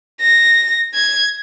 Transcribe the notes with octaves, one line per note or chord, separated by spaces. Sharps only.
A#6
G#6